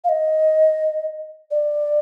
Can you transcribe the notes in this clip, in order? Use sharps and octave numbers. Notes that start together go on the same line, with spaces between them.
F5
D#5
D5